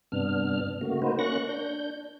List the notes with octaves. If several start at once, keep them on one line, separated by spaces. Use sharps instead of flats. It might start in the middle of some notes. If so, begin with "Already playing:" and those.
G2 C3 B3 D4 F6
C#3 A3 A#3 F#4
A#3 D#4 F#4 B4 C5
A#3 C#4 C#6 F#6 A#6
D4 G6